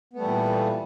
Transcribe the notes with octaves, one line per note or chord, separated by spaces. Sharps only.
A#2 E3 G3 A3 B3